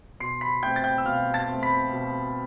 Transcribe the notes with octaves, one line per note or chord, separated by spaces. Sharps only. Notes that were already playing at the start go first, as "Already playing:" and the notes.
B2 C6 C7
B5 B6
A3 C4 G5 G6
A6
G5 G6
E6
B2 F5 F6
A5 A6
A3 C4
B5 B6
B2